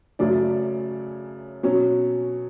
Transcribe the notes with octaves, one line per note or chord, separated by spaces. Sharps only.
F#2 C#3 F#3 A3 C#4 D5
B2 F#3 C#4